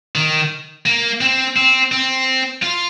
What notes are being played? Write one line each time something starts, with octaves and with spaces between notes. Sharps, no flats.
D#3
A#3
C4
C4
C4
F4